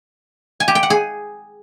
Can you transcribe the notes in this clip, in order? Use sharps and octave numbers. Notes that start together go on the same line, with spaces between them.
G#5
G4
G5
F#5
G#4